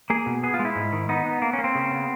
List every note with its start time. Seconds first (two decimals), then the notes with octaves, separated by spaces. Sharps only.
0.10 A#3 G#4
0.26 B2
0.43 B3 G#4
0.54 F4
0.59 G#3
0.65 E4
0.76 G#2
0.92 D#3
1.09 B3 D#4
1.26 B3
1.42 A#3
1.53 C#4
1.59 A#3
1.64 C4
1.75 C#3
1.91 B3